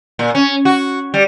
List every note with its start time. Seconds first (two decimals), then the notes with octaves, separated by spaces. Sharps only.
0.19 A#2
0.35 C#4
0.65 F#4
1.14 G3